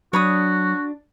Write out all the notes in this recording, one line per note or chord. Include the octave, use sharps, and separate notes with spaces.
F#3 D4 F#4 C#5 B5 D#6